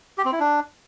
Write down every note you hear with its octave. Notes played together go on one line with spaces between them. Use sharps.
G4
C4
E4
D4